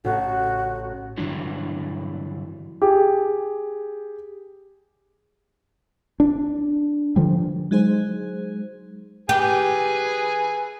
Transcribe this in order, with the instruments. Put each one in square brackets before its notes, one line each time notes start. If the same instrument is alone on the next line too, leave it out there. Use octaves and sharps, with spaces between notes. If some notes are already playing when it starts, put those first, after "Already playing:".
[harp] A1 [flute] F#4
[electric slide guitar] G2 D3 E3 F#3 D4
[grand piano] G4 G#4
[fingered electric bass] D4
D3 F3 G3
[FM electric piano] F#3 G#3 D#4 G#4 C5
[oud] G4 [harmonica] G#4 B4 G#5